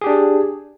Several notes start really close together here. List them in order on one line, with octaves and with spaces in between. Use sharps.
G#4 G4 D4